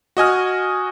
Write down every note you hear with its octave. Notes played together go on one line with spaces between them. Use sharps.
F#4 D#5 G#5 F6